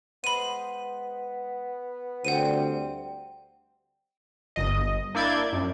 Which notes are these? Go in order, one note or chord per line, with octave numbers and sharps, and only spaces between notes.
G#3 B3 C5 B5 D#7
D2 G3 C4 G#4 C5 F#5 D#7
G1 D#5
A#3 D4 E4 D5 G6 G#6
F#2